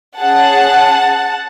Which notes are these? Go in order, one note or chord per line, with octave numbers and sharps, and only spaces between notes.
C#4 G#4 F#5 A5